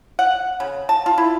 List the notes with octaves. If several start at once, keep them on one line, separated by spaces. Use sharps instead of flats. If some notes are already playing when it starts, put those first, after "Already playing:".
F#5
C#3
A5
F4
E4